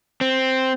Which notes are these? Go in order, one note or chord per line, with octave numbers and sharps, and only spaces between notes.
C4